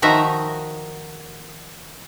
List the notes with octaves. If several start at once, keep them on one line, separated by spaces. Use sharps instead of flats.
D#3 F3 D#4 F#4 E5 A#5